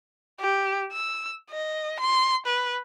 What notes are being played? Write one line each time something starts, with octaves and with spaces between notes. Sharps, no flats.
G4
E6
D#5
C6
B4